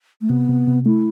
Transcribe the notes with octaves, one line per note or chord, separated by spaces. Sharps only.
A3
C3 B3
C3
C3
A3 E4